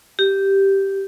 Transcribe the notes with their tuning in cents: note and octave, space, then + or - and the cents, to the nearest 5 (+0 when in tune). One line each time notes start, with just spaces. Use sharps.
G4 -5